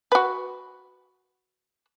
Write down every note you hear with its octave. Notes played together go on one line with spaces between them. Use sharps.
F#4 B4